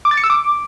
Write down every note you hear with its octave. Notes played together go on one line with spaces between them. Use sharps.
D6
A6
C#7
E6
D6